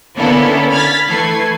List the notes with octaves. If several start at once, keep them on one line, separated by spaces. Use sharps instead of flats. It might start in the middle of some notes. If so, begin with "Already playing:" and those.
D3 A#3 B3 C#4 E4 A4
B5 F6 G#6 A6 B6
E3 A3 A4 B4 G#6 C7